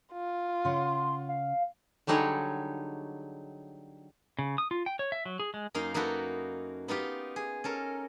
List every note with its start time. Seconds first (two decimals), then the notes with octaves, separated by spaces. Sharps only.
0.13 F4
0.65 C#3 F#5 C6
1.29 F5
2.07 D3 F#3 G3 D#4 G#4 C#5
4.39 C#3
4.58 D#6
4.71 F4
4.86 G5
4.99 C#5
5.12 E5
5.26 F#3
5.40 G#4
5.54 G#3
5.74 F#2 A#3 D#4 F5
5.94 A#3 D#4 E4 F#4 A4 B4
6.88 B3 D#4 F4 G4
7.36 G#4
7.64 C#4 A4 A#4